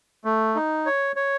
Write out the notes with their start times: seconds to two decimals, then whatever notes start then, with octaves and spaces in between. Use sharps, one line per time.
0.25 A3
0.55 D#4
0.86 C#5
1.16 C#5